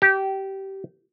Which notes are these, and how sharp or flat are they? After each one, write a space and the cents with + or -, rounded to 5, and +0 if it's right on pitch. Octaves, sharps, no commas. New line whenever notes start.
G4 -20